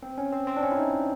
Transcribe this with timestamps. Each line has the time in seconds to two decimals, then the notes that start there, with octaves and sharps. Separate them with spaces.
0.03 C4
0.18 C#4
0.32 C4
0.47 C4
0.57 D4
0.62 C#4
0.72 E4
0.77 D#4